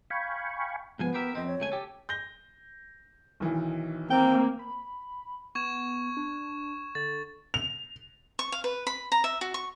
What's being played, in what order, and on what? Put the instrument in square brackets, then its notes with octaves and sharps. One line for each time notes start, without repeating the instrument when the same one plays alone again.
[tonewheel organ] F5 G5 G#5 B5 C#6
[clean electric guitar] G#2 F3 G#5 [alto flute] B3
[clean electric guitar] G4 A#4 E5
[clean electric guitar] F2 C4 [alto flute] D#5
[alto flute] C#5
[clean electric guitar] C#2 A3 G#5
G4 A4
[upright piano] G6 A#6 G7
B1 D#3 E3
[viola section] A#3 [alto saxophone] C4 [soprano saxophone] G5
[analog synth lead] B5
[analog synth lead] B3 [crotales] C#6 G#6 E7
[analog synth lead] D4
[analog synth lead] D3 [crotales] A6
[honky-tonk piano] F7
[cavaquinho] C#6
F5
B4
B5
A#5
E5
F#4
C#6